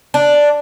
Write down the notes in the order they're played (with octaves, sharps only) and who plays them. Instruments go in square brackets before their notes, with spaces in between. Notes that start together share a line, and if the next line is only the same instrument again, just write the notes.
[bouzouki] D4